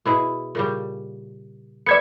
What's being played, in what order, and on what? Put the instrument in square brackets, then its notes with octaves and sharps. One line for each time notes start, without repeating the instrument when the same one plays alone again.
[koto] B2 E4 G#4
A#2 C#3 G3
[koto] B3 B4 E5 [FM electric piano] D5 G#6 C#7